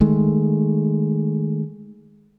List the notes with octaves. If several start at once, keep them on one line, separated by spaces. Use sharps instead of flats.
D#3 G#3 A3